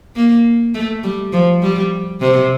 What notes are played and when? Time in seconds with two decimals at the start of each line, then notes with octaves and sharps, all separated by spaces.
0.16 A#3
0.74 A3
1.04 G3
1.33 F3
1.62 G3
2.21 C3